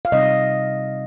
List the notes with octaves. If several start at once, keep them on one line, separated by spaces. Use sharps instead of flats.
F5
C3 G3 C4 D#4 D#5